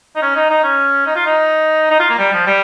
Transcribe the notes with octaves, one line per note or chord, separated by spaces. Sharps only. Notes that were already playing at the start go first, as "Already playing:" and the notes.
D#4
C#4
D#4
D#4
C#4
D#4
F4
D#4
D#4
F4
A#3
G3
F3
G3